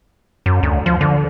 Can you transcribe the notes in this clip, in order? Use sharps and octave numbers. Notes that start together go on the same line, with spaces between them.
F#2
D2
F3
D3